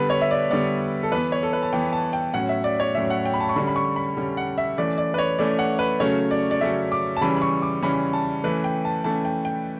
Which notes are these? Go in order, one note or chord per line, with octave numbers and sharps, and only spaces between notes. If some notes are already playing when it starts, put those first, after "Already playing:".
Already playing: D3 G3 B3 B4
C#5
E5
D5
D3 G3 B3 D5
A4
E3 B3 B4
C#5
A4
B4
A5
E3 B3 G5
A5
G5
A2 F#3 C#4 F#5
E5
D5
C#5
A2 F#3 C#4 E5
F#5
G5
B5
A5
C#6
D3 G3 C#4 B5
B5
C#6
B5
D3 G3 C#4
F#5
E5
E3 A3 C#4 D5
D5
B4
C#5
E3 A3 C#4 D5
F#5
B4
C#3 F#3 A3 C#4 C#5
D5
D5
C#3 F#3 A3 C#4 E5
D6
A5
C#3 E3 G3 C#4 B5
B5
C#6
D6
C#3 E3 G3 C#4 B5
A5
E3 A3 C#4 B4
G5
A5
E3 A3 C#4 A5
G5
G5